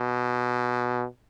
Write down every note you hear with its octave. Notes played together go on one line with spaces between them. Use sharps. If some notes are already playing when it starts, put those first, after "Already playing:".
Already playing: B2